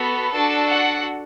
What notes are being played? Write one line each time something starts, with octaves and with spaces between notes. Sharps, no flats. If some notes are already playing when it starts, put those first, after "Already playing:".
Already playing: B3 F#4 A4 B5
D4 F#4 A4 A5
F#5